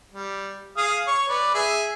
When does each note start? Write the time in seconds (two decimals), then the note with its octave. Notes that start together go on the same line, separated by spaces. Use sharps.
0.12 G3
0.77 G#4 F5 D#6
1.07 C#5 C#6
1.29 B4 D5
1.54 G#4 E5